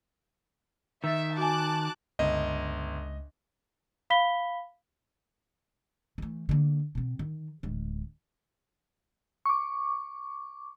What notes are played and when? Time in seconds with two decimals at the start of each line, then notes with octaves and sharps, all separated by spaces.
1.04 D#3 E5 E6 A6
1.37 F#4 G#5 A5 D6 F#6
2.19 G1 C#2 D#5
4.10 F5 B5 B6 G7
6.18 E3 A3
6.49 D3 A#3
6.95 B2 C4
7.19 D#3
7.63 D1 G#3
9.46 C#6 D6